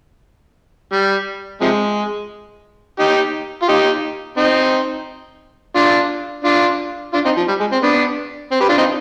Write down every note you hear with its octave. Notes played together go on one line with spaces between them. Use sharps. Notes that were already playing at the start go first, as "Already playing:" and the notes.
G3
C3 F3 G#3
D#4 G4
F4
D#4 G4
C4 D#4
D4 F4
D4 F4
D4 F4
C4 D#4
F3
G3
G#3
C4
B3 D4
C4
G4 B4
D4 F4
C4 D#4